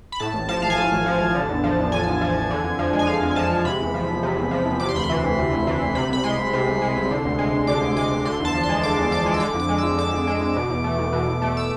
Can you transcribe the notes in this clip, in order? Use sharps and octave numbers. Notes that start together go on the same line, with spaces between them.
B5
A2 A5
A1
F3 A5
A1 F5
G#5
A2 A5
A1
F3
A1
D3
E2
F3
E2
D3 G#5
E2
F3
E2
D3
F2
F3
G#3
G#5
D3 F5
F2
G#5
F3 A5
G#3
C3 B5
E2
F3
E2
C3
E2
F3
E2
C3 D6
C6
D2 B5
C6
E3
D2
C3
D2
E3
D2
C3 B5
C2 B5
G#3 C6
C2
C3
C2
G#3
C2
D3
D2
G#3
D2
D3 D6
D2
G#3 D6
D2
D3 C6
E2 A5
F3
C6
G#3
D3 D6
E2
F3 D6
G#3
E6
D3 D6
F2
D6
G#3
F2 E6
D3 D6
F2
G#3
F2
B2
E2
A3
E2
B2
E2
A3
E6